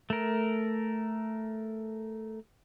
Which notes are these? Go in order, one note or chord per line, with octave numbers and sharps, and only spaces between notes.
A3 A#4